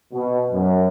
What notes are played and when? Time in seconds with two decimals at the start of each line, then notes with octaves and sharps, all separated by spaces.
0.13 B2
0.52 F#2